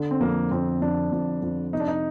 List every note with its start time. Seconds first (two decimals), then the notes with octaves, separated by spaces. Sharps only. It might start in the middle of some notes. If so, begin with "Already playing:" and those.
Already playing: D3
0.11 C4
0.21 F2 A#3
0.51 F2 C4
0.81 F2 D4
1.12 F2
1.42 F2
1.73 C3 D#4
1.80 D4
1.88 D#4